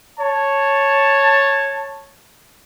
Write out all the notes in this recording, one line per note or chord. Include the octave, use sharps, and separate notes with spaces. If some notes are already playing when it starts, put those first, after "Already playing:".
C#5 A5